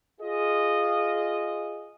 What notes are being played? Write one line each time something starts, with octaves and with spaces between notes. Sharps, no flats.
F4 G#4 D#5